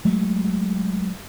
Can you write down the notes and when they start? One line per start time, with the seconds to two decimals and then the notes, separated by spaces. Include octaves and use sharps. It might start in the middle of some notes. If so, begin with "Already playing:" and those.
0.05 F#3 G#3 A3